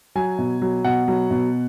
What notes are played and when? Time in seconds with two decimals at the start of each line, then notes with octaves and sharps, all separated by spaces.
0.15 F#3 G#5
0.38 B2
0.62 F#3
0.84 B2 F#5
1.08 F#3
1.31 B2